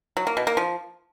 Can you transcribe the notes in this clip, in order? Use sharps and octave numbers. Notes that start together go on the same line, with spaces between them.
F#3
A#3
B2
A#3
F3